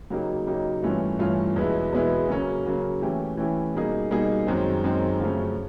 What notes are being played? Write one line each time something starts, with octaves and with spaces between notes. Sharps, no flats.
C#3 F#3 A#3 D#4 G4
C#3 F#3 A#3 D#4 G4
G2 E3 A3 C#4 F4
G2 E3 A3 C#4 F4
E2 B2 G#3 B3 E4
E2 B2 G#3 B3 E4
C#3 F#3 A#3 C#4
C#3 F#3 A#3 C#4
E3 A3 C#4 E4 G4
E3 A3 C#4 E4 G4
B2 G3 A#3 D#4 G#4
B2 G3 A#3 D#4 G#4
F#2 D#3 G#3 C4
F#2 D#3 G#3 C4
F#2 C#3 F3 A3 C#4